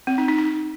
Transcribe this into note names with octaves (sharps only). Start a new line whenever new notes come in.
C4
D#4
D#4
D#4